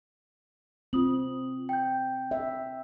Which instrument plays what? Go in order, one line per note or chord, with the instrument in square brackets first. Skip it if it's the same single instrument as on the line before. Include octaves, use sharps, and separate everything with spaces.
[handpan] C4 [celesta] F4 D#6 F#7
[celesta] G5 G6
[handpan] E5